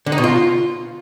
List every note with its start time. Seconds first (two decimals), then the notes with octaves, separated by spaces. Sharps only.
0.06 D3
0.12 D#4
0.18 B2
0.24 F4